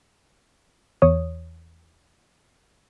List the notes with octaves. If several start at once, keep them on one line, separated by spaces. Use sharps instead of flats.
E2 C#5 D#6